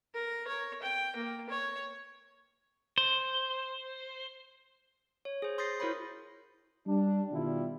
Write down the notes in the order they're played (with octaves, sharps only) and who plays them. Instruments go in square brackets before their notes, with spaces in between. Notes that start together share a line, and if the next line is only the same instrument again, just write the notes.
[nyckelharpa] A#4
C#5
G5
A#3
C#5
[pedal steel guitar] C5
[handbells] C#5
G#4 C5
C6 D#6 G6 A6 A#6 C7
E4 F#4 A#4 C5 C#5 B5
[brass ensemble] G3 D4
B2 D#3 G3 E4 F4 G4